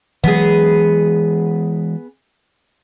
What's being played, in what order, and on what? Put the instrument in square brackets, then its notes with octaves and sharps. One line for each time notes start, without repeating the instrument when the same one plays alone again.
[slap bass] E3 F#3 G#3 [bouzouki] B3 G#4